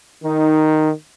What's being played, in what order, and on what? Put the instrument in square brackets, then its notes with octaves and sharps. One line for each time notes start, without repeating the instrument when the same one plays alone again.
[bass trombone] D#3 [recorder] D#4